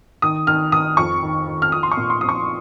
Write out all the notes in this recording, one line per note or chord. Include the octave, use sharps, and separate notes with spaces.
D#3 D#6
D#3 F6
D#3 D#6
F2 C#6
D#3
D#3
F6
F3 D#6
C6
C#6
A#2
C6
F3 D#6
C#6